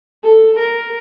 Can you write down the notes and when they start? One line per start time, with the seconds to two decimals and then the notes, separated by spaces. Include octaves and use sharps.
0.24 A4
0.59 A#4